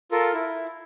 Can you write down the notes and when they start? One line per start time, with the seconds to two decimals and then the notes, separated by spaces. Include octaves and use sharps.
0.12 F4 A4 A#4
0.34 E4